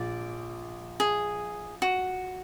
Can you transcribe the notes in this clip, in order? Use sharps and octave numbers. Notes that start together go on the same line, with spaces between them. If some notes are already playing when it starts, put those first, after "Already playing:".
Already playing: A#1 D5
G#4
F#4